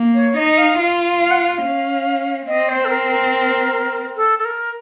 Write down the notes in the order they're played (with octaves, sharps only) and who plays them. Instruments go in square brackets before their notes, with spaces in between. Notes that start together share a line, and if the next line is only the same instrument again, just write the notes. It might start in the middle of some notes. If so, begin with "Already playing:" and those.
Already playing: [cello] A#3
[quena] C#5
[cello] D#4 [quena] D#5
[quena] F5
[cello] F4
[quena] F5
F#5
F5
[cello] C#4
[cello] C4 [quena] D#5
[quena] C5
A4
A#4
A#4
A4
A4
A#4